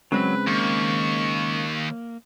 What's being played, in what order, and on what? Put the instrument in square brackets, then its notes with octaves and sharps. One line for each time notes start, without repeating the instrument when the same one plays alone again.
[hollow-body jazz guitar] C#3 G#3 C4 [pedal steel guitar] F#3 [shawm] B4
[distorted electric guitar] D#2 [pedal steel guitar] A#3 [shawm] C#6